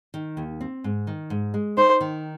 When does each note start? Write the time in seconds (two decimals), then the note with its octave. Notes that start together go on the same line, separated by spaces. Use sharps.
0.14 D#3
0.37 D#2
0.61 C4
0.84 G#2
1.07 D#3
1.30 G#2
1.54 G#3
1.77 D#4 C5
2.01 D#3